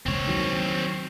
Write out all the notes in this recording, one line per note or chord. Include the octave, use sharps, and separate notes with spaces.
E1 C#2 C4 C#5
D#3 F#3